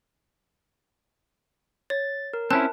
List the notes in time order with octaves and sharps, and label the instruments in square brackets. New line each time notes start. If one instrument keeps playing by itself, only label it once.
[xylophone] C#5 [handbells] A6
[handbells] A#4
[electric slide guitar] C4 C#4 E4 [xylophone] A5 F#6